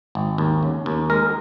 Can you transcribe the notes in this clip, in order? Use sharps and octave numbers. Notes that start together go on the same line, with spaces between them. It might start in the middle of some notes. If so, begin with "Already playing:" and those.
G#1
D#2
C#3
D#2
G#3 A#4